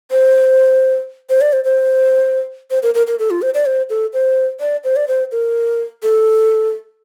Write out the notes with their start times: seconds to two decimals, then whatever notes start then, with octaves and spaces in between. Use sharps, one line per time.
0.11 C5
1.30 C5
1.41 D5
1.53 C5
1.65 C5
2.71 C5
2.83 A#4
2.95 A#4
3.07 A#4
3.19 A4
3.31 F4
3.42 C5
3.54 D5
3.66 C5
3.90 A4
4.13 C5
4.60 D5
4.84 C5
4.96 D5
5.08 C5
5.32 A#4
6.03 A4